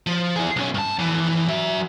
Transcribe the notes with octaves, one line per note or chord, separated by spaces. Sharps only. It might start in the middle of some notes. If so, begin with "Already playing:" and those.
F3
E4 G#4
B1 C#4
G2 A5
F2 E3
F#3 E5